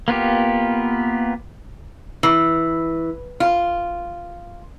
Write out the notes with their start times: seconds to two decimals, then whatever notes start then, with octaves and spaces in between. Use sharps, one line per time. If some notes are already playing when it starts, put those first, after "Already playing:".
0.08 A#3 B3 F4 G4
2.23 E3
3.40 F4